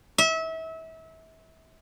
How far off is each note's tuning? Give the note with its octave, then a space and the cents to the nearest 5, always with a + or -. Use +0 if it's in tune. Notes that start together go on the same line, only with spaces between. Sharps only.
E5 -30